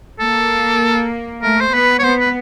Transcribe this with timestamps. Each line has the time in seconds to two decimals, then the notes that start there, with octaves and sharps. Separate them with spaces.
0.20 A#3 A4
1.43 A3 A#4
1.61 C5
1.73 B3 B4
1.99 C#5
2.04 B3 C5
2.20 B4